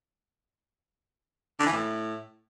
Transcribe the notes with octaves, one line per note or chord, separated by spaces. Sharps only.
D3
E3
A2